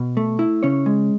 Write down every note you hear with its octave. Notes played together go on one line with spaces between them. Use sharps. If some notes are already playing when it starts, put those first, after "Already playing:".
Already playing: B2
A3
E4
C#3 C#4 C#5
G#3